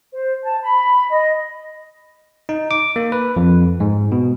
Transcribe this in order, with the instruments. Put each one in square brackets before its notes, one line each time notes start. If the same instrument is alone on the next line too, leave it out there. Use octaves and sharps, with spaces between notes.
[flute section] C5
A5
B5
D#5
[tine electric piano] D#4
D6
A#3
B4
F2
G#2
B2